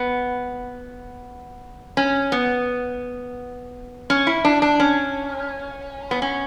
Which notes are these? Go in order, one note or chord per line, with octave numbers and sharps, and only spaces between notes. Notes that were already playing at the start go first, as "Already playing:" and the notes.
Already playing: B3
C#4
B3
C#4
E4
D4
D4
C#4
B3
C#4